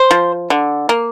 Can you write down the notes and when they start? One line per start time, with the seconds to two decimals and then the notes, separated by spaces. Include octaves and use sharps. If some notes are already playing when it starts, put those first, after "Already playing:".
Already playing: C5
0.11 F3
0.50 D3
0.89 A#3